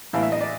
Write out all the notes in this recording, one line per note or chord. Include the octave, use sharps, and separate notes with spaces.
A2 E3 F5
E5
D#5
D5